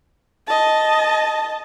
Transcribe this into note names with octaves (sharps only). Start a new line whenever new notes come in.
D#5 A5